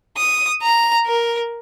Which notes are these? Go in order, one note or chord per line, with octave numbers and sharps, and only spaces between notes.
D#6
A#5
A#4